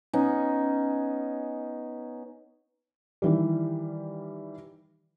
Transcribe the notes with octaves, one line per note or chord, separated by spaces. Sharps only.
B3 C#4 D#4
D#3 E3 G3